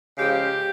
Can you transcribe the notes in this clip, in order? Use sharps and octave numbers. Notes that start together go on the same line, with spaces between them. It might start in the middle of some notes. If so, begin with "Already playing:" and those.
C#3 F3 G#3 G4